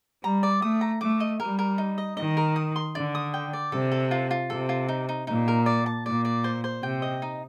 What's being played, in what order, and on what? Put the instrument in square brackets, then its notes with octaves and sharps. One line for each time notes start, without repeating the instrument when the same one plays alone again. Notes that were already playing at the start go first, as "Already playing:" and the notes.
[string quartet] G3 [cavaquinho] A#5
[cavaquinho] D5
[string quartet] A3 [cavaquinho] D#6
[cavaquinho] A#5
[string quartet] A3 [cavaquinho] D6
[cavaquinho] D#5
[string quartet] G3 [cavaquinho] A#4
[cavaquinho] A#4
D#4
D#5
[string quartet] D#3 [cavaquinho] D#5
[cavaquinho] A#4
D#6
C6
[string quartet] D3 [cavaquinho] D5
[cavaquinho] D#6
G5
D5
[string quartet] C3 [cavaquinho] A4
[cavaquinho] A4
F4
F4
[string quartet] C3 [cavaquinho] A4
[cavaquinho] F4
D#4
D#4
[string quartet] A#2 [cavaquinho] D#4
[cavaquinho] A#4
D5
A5
[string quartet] A#2 [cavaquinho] D5
[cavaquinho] D5
C5
C5
[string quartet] C3 [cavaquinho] G5
[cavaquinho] D#5
D#4